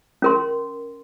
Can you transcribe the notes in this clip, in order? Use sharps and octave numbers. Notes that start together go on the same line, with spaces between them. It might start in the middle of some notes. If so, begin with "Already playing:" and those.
C#4 A#4 C6